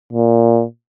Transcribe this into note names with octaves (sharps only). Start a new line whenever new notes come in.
A#2